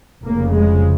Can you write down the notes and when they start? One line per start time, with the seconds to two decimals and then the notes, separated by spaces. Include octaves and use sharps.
0.24 F1 F2 C#3 A#3
0.54 G#3